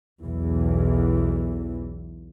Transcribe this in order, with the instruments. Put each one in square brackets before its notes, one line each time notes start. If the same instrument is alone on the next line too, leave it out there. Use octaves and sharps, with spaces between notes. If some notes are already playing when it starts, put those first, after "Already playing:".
[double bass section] B1 E2 E3